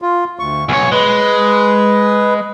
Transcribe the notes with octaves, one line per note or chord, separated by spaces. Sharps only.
F4
D2 C#6
B1 C#5 G#5
G#3 B4